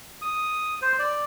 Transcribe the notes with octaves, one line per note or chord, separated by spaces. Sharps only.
D#6
C5
D5